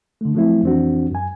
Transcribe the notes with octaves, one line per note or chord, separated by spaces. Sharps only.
D3 A3
F3 F#3 A3 C4 E4
F2 E3 C4 D4 F#4
F#2 G#5